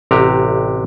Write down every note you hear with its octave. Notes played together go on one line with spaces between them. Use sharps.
A1 C3 F#4 G4 A#5